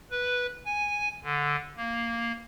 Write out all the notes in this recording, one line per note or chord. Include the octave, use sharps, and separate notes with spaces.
B4
G#5
D3
A#3